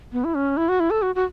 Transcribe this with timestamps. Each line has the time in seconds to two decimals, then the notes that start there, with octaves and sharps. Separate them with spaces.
0.13 B3
0.24 E4
0.35 C#4
0.57 E4
0.69 F#4
0.80 E4
0.90 A4
1.02 F#4
1.15 F#4